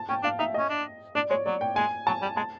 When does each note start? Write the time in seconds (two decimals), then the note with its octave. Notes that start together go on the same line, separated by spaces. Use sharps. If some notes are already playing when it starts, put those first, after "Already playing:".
Already playing: A5
0.09 C#4 G5
0.23 D4 F5
0.39 D#4 E5
0.54 C#4 D#5
0.69 D4
1.15 D4 D5
1.30 G#3 C#5
1.46 F#3 D5
1.61 G5
1.76 G#3 G#5
2.07 F#3 A5
2.22 G3
2.37 G#3 A5